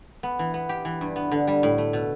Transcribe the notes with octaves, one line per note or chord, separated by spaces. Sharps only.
B3
E3
B3
G4
E3
G2
B3
D3
G3
A2
A3
B2